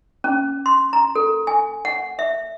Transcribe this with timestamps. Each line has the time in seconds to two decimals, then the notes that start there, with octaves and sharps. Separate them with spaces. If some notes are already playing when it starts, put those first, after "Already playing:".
0.24 C#4
0.66 C6
0.93 A#5
1.16 A4
1.47 G#5
1.85 F#5
2.19 E5